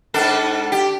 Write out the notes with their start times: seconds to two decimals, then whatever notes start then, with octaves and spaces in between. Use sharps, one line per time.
0.14 G#2 D4 A4
0.72 G4